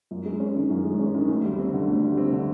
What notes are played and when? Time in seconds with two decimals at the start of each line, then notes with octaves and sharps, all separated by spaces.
0.11 F#2
0.26 G#3
0.40 C#4
0.56 D#3
0.70 F#2
0.84 G#3
0.99 C#4
1.14 D#3
1.29 D2
1.44 G3
1.59 C4
1.73 D3
1.88 D2
2.03 G3
2.17 C4
2.32 D3